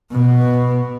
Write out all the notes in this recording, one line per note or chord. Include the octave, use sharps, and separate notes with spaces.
B2